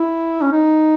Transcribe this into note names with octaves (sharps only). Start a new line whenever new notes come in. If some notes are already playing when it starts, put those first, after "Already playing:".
Already playing: E4
C#4
D#4